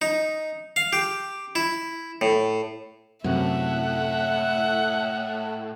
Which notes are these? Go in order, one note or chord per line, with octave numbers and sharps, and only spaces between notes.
D#4
F5
G4
E4
A2
F#2 A2 C3 E5 F#5